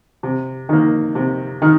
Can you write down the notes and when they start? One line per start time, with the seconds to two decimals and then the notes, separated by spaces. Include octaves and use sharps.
0.23 C3
0.69 D#3 A#3
1.15 C3
1.62 D#3